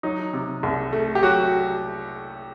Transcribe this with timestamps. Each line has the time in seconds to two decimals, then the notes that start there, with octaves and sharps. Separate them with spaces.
0.03 F#3 D#4
0.33 C3
0.63 C2
0.93 A3
1.15 G4
1.22 F#3 F#4